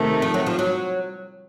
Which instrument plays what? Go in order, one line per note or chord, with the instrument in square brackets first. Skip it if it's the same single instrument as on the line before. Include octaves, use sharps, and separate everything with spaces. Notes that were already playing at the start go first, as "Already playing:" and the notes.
Already playing: [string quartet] C3 D#3 A3
[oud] F3
F#3
F3
F#3